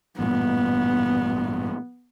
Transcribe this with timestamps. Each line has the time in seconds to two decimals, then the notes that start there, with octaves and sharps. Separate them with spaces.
0.19 A1 G2 A#2 B3